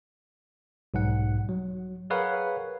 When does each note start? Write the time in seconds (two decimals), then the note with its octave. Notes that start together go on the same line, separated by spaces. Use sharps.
0.94 B1 G#2 F#5
1.49 F#3
2.10 G#4 A#4 B4 C#5 F5 F#5